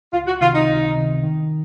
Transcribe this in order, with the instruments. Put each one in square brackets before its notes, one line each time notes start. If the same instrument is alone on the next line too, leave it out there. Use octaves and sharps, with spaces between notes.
[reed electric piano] C#2 [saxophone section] F4
[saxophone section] F#4
[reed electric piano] C3 D#3 [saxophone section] F4
[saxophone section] D#4
[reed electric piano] C#2
C3 D#3
D#3